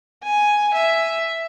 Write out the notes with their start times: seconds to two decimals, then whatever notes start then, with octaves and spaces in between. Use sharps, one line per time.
0.23 G#5
0.74 E5